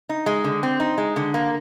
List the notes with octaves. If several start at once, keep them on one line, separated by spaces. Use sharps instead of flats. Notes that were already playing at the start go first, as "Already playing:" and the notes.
D#4
G#3
D3
C4
D#4
G#3
D3
A#3